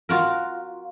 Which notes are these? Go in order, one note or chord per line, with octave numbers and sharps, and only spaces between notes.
F4 F#4 A#4